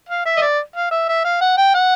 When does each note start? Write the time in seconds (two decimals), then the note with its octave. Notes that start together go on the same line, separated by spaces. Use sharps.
0.09 F5
0.25 E5
0.37 D#5
0.42 D5
0.76 F5
0.91 E5
1.08 E5
1.24 F5
1.41 F#5
1.57 G5
1.74 F#5